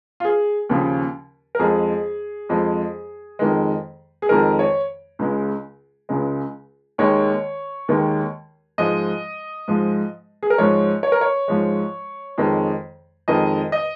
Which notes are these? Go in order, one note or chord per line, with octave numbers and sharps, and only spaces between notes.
F4
G#4
D#2 C#3 F3
A#4
F2 F3 G#3 G#4
F2 F3 G#3
F2 D#3 G#3
G#4
F2 D#3 G#3 A#4
C#5
C#2 C#3 G#3
C#2 C#3 G#3
D#2 D#3 G#3 C#5
D#2 D#3 G#3
G#2 F3 G#3 D#5
G#2 F3 G#3
G#4
A#4
G#2 F3 G#3 C#5
C#5
A#4
C#5
G#2 F3 G#3
F2 D#3 G#3
F2 D#3 G#3 D#5
D#5